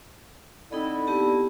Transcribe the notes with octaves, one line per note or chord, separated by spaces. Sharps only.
D3 C4 D#4 E4 A4 D#5
B3 G4 A5